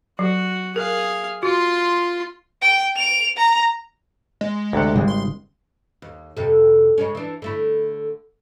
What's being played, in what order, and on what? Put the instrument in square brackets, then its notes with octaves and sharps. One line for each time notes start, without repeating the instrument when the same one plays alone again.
[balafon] F#3 [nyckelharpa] F#4
[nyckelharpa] G#4 F5 [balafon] A#4
[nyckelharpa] F4 C6 [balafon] F#4
[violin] G5
D7 F7
A#5
[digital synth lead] G#3
[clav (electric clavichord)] D2 C3 F#5
[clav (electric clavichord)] G#1 [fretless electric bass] C#3 G3 G#3
[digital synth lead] C6
[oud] D#2
F2 C3 A4
C#3 G#3 C#4
E3 D4
D3 A3 E4